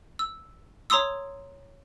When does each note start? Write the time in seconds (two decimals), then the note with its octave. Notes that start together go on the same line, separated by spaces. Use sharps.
0.19 E6
0.90 C#5 A#5 C6 D#6 E6